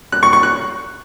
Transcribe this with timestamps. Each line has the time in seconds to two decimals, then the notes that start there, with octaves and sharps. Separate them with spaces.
0.12 F#6
0.23 C#6
0.33 C#6
0.43 F#6